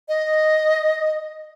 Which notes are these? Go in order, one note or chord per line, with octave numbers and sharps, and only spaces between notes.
D#5